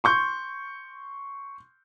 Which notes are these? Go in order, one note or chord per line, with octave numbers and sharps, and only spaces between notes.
C6 C#6 G6